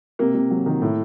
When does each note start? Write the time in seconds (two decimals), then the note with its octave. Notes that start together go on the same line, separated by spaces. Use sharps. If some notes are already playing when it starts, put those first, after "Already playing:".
0.19 C3 A#3
0.34 C3
0.51 F#3
0.66 D#3
0.82 A2